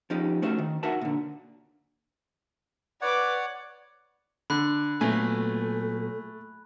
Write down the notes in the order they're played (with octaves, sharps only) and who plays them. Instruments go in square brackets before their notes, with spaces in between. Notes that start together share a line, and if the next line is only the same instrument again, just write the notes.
[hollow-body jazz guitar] F3 C#4 D#4 G4
A3 C#4 F#4 C5 E5
D#3
D#4 F#4 A#4 E5 F#5 A5
A#2 D3
[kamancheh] B4 D6 [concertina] C#5 D5 F#5
[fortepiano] D3 [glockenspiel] B5 F#6
[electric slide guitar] A#2 F#3 B3 [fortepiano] A3 G#5 [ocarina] A4